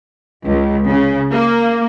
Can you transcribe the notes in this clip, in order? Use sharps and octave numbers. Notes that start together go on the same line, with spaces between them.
C#2
C#3
A#3